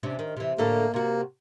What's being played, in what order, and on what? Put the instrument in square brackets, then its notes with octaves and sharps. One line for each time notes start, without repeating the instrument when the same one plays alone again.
[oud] C3 C#4 D4
D#3
C3 E3
[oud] A2 D3 A4 [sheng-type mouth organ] A#3
[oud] C3 F#4 [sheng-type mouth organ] A#3